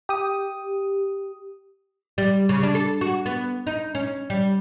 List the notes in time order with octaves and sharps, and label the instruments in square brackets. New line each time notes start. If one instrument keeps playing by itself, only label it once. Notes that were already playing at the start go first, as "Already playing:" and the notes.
[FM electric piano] G4 D#6
[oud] G3
C#3
D4
A4
F#4
B3
D#4
C#4
G3